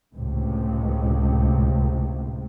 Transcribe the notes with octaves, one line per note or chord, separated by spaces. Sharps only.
C#2 A2 C3